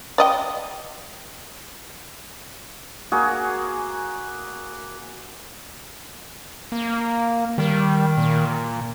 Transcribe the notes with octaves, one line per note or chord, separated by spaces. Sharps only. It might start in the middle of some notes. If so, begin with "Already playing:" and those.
D5 D#5 G5
A#3 F#4 G#4
A#3
D#3 G3
A#2